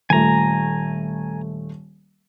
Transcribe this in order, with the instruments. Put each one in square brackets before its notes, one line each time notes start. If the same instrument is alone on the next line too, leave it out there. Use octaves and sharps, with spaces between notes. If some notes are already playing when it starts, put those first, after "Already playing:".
[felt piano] D#1 A3 [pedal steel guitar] G#5 A#5